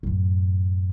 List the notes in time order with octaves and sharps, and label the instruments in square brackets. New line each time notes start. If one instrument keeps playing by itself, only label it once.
[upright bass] F#2 A2